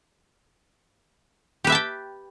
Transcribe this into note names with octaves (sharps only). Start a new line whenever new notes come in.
G4 B4 E5 G5 A5